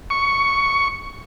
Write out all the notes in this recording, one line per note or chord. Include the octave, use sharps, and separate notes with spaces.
C#6